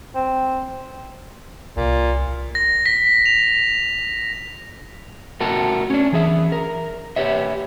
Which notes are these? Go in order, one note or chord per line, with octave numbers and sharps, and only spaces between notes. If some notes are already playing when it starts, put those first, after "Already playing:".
C4
C2 A#2
A#6
B6
F7
A3 F#4 A#4 A5
C#4 D4
E3 G#4 E5
A#4
G4 B4 C#5 E5